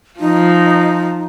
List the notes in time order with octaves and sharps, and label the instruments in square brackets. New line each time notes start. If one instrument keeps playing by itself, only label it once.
[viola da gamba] F3 [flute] D#4